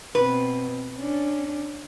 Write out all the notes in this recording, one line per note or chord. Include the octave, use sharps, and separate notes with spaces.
B2 C4 B4
C#4 D4